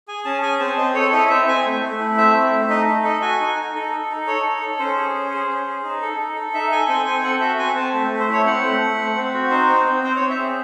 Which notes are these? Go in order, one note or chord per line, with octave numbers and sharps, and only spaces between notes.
G#4 G#5
C#4 A5
G#4 G#5
C4 A5
C4 D#5
A4 C#5
E4 D#5
C4 E5
C4 G#5
A3
A3
E4
C4 E5
A3
A3
D#4 D#5
D#4
A4 D#5
F#4 G#5
D#4
D#4
D#4 A4
A4
D#4
A4 C#5
D#4
A4
C#4 C5
G#4
C#4
G#4
C#4
G#4
D#4
A4
D#4
A4
D#4 E5
A4 G#5
C4 G#5
C4 G#5
A4 F#5
F#4 E5
C4 G#5
C4 A5
A3
A3
C5
E4 C#5
C4 F#5
A3
A3
C4
C4
F#4
D#4 C5
C4
C4
C4 C5
C#5
C4
E5
G#4